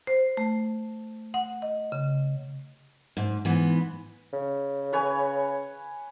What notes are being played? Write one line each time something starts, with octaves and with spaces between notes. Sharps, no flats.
C5
A3
F#5
D#5
C#3
G#2
G#2 E3 B3
C#3
B4 C#5 G#5